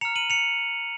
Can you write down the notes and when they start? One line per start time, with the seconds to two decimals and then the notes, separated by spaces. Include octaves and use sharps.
0.01 A#5 F6 C#7 F7
0.16 D#7 F#7
0.30 C#7 F7